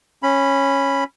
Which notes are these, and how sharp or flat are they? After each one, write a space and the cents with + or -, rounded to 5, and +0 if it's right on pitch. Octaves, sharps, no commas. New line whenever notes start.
C#4 -10 B5 +0